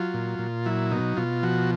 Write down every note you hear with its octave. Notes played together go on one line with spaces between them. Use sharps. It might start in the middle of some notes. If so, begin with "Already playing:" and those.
Already playing: F#3 F4
A#2
A#2
F#3 E4
B2 D#4
B2 F4
F3 F#4